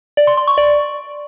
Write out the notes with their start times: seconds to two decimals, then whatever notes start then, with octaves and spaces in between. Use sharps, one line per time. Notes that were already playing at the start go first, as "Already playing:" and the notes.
0.17 D5
0.27 C6
0.37 C6
0.48 C#6
0.58 D5